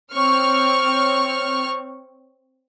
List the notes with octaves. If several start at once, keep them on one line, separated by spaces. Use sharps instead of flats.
C4 C#5 C#6 F6